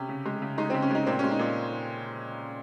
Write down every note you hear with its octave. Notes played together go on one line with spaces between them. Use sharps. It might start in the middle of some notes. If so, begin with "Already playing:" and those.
Already playing: C3 C#4
C#3
G#3
C#3
G#3 D#4
C#3 C4
C#4
G#3 D#4
A#2 C4
G#3 C#4
D#4
A#2